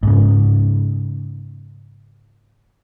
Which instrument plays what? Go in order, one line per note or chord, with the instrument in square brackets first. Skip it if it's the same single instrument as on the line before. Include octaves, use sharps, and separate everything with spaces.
[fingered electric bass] G#2 C#3